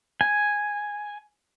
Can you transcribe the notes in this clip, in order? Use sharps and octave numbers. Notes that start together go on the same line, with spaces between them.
G#5